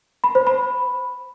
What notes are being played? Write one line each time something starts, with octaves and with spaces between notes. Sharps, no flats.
B5
C5
B5